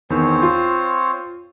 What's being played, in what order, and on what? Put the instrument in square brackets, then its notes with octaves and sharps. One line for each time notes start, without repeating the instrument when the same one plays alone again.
[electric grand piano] E2 D#3 [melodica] C4 C5 C#5
[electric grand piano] F4